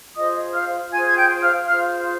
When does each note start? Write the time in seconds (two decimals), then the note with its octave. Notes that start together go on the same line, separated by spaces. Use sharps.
0.15 F4 G#4 C5 D#5 D#6
0.54 F5 F6
0.91 F4 G#4 C5 G#5 G#6
1.09 G#6
1.16 G5 G6
1.42 F5 F6
1.67 F4 G#4 C5 F5 F6